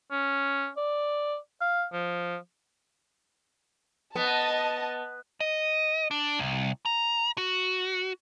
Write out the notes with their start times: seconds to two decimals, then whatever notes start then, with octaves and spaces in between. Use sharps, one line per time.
0.11 C#4
0.77 D5
1.61 F5
1.93 F3
4.16 B3 D#5 A5
5.40 D#5
6.11 D4
6.39 C2
6.86 A#5
7.38 F#4